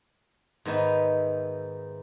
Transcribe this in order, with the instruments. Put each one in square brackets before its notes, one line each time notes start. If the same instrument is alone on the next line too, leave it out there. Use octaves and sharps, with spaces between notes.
[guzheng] G#2 D#3 B3 D#4 E5